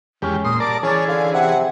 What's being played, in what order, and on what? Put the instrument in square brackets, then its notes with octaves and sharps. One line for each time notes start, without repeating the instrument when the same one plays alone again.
[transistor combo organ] E2 G4 [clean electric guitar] G#3 C#4
[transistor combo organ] A#2 C6 [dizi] D#6
[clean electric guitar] G3 [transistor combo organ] A#4 D5 A5 [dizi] D6
[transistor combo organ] E3 G#4 [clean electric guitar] C#4 D5 [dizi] C#5
[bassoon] D3 [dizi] F5
[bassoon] C3 [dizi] F#5